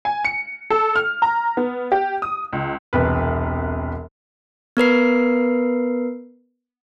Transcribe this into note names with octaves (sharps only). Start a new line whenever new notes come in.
G#5
C#7
A4
F6
A#5
B3
G4
D#6
C#2
E1 C2 B4
B3 A#4 B4 C7